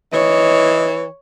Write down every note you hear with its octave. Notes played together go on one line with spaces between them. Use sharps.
E3 C#5 D#5